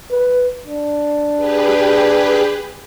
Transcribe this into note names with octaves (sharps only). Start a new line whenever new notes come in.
B4
D4
G4 G#4 B4